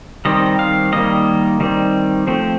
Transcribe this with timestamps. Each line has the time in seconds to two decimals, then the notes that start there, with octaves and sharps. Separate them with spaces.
0.25 D#3 G3 C4 D#5
0.59 F5
0.92 D#3 G3 A#3 D#5
1.60 D#3 G3 C4
2.27 F3 A3 C4